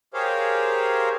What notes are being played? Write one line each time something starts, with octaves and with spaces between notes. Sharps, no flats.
G4 G#4 A#4 C5 C#5 F5